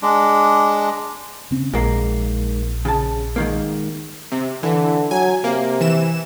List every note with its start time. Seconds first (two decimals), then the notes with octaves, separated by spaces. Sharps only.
0.02 G#3 D4
1.51 C#3 C4 C#4
1.74 A#1 G#2 A#3
2.85 C#3 A5
3.36 G#2 D#3 A#3
4.32 C3
4.63 D3 E3
5.11 F#3 G#5
5.44 C3 A#3
5.81 E3 E7